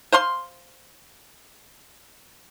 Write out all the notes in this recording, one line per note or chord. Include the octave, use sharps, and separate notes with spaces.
C5 F5 C6